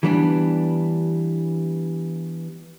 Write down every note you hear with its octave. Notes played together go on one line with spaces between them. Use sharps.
E3 G3 B3 D4